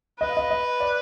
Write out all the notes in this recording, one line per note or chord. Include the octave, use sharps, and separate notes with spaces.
B4 D#5
F5
D#5
D#5
D5